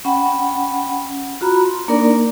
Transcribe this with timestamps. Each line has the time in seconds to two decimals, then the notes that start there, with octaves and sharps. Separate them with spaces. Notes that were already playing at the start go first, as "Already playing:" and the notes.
0.05 C#4 F#5 G5 B5
1.41 F4 F#4 A#5 B5
1.64 C6
1.88 A#3 D4 D#4 A#4 D5